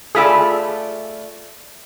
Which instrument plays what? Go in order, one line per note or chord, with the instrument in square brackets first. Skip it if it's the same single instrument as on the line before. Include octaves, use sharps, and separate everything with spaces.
[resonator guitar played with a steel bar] A3 F4 D5 [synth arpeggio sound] G#4 B5 E6